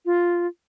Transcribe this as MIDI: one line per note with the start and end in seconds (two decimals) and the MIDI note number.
0.05 0.47 65